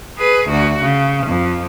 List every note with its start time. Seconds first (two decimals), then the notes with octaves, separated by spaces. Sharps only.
0.18 G#4 B4
0.49 D2 F#4
0.83 C#3
1.27 F2